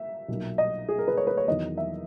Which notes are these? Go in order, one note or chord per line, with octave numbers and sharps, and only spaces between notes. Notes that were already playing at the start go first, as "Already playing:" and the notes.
Already playing: E5
B1 A#2 F#3
D#5
G#4
A#4
B4
C#5
B4
C#5
E2 D#3 F#3 D#5
E5